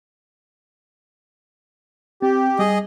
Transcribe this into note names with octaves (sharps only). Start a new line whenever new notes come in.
C4 G4
G3 G#4 D#5